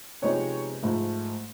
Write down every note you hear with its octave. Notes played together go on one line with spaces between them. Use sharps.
C3 F3 G#3 B3 D#4 C#5
G#2 F3 A3